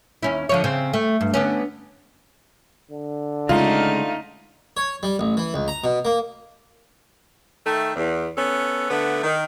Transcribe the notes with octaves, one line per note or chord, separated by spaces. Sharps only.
D#2 C#4 E4
D3 F3 C#5
C#3 C4
A3
G2
D3 B3 C#4
D3
C#3 G#3 A3 D#4 F4
C#5
G3
A1
E3
C#2
A#5
B2
A#3
D#3 A3
E2
B3 C#4 A4
D3 A3 B3
D#3